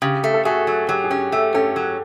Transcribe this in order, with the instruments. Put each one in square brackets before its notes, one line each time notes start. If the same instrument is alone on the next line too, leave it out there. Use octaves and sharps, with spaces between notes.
[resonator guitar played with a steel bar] C#3 [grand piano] G4
[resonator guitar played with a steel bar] A3
[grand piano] A4
[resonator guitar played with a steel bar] A3 [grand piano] F#4 G#4
[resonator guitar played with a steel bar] F#3
[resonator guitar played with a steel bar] F#3 [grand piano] G4
[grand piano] G#4
[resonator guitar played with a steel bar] C#4 [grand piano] G4
[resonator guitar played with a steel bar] A3 [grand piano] G4
[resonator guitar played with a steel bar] C#4 [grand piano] G4 A4
[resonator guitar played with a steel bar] F#3